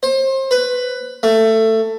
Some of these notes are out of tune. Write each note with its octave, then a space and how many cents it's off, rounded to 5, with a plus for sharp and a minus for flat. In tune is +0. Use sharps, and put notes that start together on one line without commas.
C5 +30
B4 +10
A3 +15